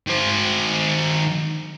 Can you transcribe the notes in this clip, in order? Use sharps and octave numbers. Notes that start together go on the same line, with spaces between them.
D#3 C5